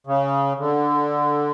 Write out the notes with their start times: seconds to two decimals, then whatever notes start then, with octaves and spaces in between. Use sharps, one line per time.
0.07 C#3
0.59 D3